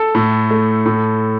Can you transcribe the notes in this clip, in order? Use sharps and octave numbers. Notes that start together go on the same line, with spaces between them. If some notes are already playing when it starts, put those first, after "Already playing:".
Already playing: A4
A2
A3
A2